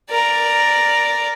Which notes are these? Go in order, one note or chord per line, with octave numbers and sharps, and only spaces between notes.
A#4 D5